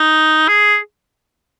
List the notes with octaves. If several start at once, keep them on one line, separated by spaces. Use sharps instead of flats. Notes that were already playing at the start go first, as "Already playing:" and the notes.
Already playing: D#4
G#4